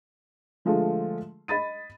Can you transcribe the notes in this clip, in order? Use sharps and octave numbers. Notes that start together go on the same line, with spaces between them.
D3 F3 G#3 A3 F4
D#5 B5 A6 D#7